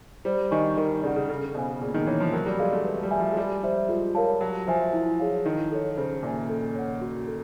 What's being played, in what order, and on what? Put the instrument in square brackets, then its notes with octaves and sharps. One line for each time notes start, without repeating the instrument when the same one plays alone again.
[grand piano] G3 [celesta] C5
[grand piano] D#3 [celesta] D#5 G#5 C#6
[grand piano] D#3 [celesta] A#4
[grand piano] C#3 [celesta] D5 F#5
[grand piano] C#3
[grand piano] C#3 [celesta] A4
[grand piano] B2 [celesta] C5 F5 G#5
[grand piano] A#2 [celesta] G#4
[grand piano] D#3
[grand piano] E3 [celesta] C#5 E5
[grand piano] F3
[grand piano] F#3 [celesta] A#4
[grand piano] G3
[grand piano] G#3 [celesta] D5 F5
[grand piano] A3
[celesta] B4
[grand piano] G3
[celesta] E5 G#5
[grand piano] F3
G#3
[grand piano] G3 [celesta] G4
[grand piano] G3 [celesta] C5 E5
[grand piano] G#3 [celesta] F4
[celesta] A#4 C#5 F5 A5
[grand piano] F#3 [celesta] G4
[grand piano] F3 [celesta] C5 E5 G#5
[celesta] E4
G#4 C#5 F5
[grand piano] D#3 [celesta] E4
[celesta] A4 C#5
[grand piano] C#3 [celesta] C5
[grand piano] A#2 [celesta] E5 G#5
[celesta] A4
C#5 F#5
F#4
A4